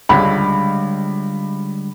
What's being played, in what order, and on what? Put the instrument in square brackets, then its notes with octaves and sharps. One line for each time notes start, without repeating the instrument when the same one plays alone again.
[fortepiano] C#2 [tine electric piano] D3 G3 G#3 [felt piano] B5